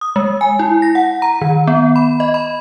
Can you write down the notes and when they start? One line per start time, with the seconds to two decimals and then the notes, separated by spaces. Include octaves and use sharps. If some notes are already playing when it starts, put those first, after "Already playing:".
0.01 D#6
0.16 G#3
0.41 G#5
0.59 E4
0.82 A#6
0.95 F#5
1.22 A#5
1.41 D#3
1.67 B3
1.96 B5
2.20 D#5
2.34 B5